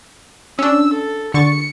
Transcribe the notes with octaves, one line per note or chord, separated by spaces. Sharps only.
C#4 D4 E6
A4
D3 C#6 A6 C#7